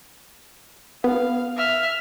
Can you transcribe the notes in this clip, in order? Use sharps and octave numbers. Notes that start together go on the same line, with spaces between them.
B3 F5
E5 F6